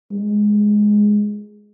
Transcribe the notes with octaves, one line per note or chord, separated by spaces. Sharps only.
G#3